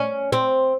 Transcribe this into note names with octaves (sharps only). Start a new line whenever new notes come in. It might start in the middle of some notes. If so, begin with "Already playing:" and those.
Already playing: C#4
C4